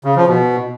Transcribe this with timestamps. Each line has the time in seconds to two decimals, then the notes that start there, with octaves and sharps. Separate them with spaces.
0.04 C#3
0.16 F3
0.28 B2